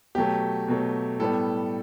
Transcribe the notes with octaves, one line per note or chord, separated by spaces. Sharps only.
B2 F#3 A3 G4
B2 F#3 A3
A2 G3 B3 A4